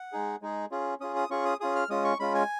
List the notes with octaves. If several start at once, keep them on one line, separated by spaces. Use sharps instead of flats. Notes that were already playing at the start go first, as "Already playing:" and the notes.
Already playing: F#5
G#3 D#4 G#4
G#3 D#4 G#4
C#4 F4 G#4
C#4 F4 G#4 D#6
D#6
C#4 F4 G#4 C#6
D#6
C#4 F4 G#4 D#6
F6
G#3 C#4 F4 D#6
C#6
G#3 C#4 F4 B5
G#5